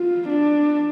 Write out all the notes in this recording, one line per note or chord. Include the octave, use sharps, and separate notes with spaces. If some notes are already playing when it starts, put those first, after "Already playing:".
Already playing: F4
D4